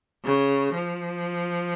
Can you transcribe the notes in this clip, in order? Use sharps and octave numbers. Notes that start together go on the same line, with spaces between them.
C#3
F3